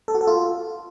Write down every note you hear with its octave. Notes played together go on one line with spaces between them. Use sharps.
A4
F#4
A4
F4